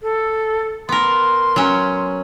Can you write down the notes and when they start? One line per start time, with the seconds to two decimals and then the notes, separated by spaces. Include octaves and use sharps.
0.02 A4
0.89 B3 A#4 C6
1.56 F#3 C#4